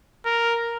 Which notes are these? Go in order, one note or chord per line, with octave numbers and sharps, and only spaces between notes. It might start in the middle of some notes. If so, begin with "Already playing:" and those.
A#4